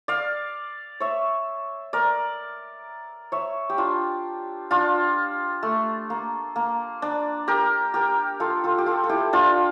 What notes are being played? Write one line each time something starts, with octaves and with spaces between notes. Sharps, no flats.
D5 F5
C#5 E5
A#4 D5
C#5 E5
G4
D4 F4
D4 F4
A3
A#3
A#3
D4
G4 A#4
G4 A#4
F4 A4
F4 A4
G4
F4 A4
A4
E4 G4
D4 F4